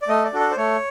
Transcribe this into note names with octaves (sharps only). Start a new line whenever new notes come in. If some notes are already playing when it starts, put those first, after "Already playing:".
D5
A3 D#5
D5
D4 F#4 A4
D5
C5
A3 C#5